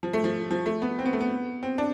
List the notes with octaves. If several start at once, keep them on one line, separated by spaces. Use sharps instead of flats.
F3
A3
F3
F3
A3
B3
C4
B3
A3
B3
C4
D4